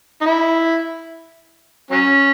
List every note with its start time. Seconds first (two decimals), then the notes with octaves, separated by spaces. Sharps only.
0.21 D#4
0.26 E4
1.91 F#3 C#4